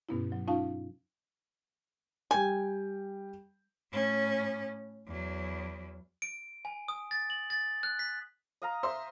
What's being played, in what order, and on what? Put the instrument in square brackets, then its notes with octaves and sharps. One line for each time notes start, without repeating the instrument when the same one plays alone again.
[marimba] G2 B2 B3 C#4 E4
F#3
C#4 D#4 F4 F5 A5
[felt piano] G3 G5 [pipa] G#5
[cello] A2 C#4
E2 F#3
[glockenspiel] D7
G#5
D#6
A6
F#7
A6
F#6
B6
[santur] D#5 F5 A#5
[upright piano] C5 E5 C6